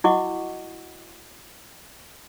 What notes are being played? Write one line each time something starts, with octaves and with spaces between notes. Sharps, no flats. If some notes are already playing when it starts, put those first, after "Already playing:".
E4 F#4 D#5 F#5 C#6 D6